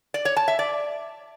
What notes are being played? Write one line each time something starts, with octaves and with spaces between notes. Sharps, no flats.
D5
C#5
A5
E5
D5